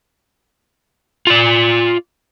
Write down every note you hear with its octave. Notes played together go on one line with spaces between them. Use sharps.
F4 D5